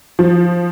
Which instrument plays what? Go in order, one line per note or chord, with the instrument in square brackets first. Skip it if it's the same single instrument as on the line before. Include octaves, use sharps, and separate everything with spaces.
[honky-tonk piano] F3